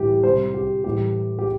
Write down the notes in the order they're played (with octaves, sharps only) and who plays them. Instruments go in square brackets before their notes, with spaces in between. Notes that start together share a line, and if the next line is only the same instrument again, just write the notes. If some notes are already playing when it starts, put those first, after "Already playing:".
Already playing: [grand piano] A2 E3 G3 G4
G3 C5
C3
G4
A2 E3 G3 G4
G4